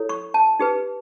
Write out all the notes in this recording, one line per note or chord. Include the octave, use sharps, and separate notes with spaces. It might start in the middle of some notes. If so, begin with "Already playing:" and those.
Already playing: E4 A4 C#5
C#6
A5
D#4 G4 B4